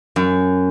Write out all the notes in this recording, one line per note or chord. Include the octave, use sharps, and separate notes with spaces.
F#2